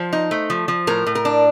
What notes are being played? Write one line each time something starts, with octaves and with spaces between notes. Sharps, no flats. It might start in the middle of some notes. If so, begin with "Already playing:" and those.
Already playing: F3 C5
D#4
A3
F3
F3
A2 A#4
A2
A#4
D4